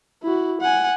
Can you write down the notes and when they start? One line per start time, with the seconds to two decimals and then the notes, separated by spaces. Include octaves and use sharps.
0.23 E4 F#4
0.61 F#5 G#5